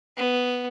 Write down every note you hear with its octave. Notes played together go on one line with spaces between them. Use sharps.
B3